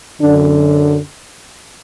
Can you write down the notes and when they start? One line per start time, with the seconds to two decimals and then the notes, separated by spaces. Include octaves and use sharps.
0.20 F#2 D3 D4